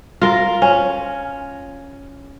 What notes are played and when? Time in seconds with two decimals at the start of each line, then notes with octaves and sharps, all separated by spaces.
0.22 F4 A#4
0.62 C#4